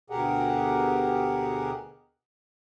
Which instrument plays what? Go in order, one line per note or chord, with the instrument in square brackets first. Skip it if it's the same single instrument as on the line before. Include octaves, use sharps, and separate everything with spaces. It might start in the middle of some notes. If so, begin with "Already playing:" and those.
[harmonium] D2 B2 G4 G#4 A#4 F#5